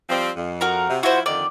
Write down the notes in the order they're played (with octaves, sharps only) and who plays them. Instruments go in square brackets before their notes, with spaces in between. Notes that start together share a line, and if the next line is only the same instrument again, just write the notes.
[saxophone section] F3 G3 C4
F2
[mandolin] F#4 A#4 A#5
[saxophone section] C3
[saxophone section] F3 E4 [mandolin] F#4 C5
[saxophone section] F2 D3 D#3 [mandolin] D5